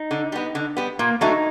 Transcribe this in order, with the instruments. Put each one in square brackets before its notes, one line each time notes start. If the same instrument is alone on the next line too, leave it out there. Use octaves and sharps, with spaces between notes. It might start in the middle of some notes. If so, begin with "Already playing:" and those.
Already playing: [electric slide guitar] D#4
[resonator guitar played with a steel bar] D3
G3 B3
D3
G3 B3
[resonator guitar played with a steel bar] A#2 [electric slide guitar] A#3
[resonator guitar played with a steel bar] F#3 A3 D4 F#4 [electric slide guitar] D#4